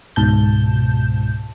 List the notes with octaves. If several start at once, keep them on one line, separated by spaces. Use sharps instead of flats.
C#2 G#2 B2 A5 G6